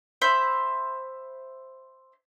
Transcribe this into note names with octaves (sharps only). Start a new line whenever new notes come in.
C5 E5 B5